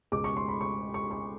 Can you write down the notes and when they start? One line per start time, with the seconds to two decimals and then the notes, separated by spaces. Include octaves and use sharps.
0.12 C#2 B2 G#3 D6
0.24 C#6
0.37 C6
0.48 B5
0.61 C#6
0.94 C#6
1.11 C#6